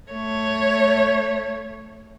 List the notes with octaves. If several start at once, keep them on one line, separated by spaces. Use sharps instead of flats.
A3 C#5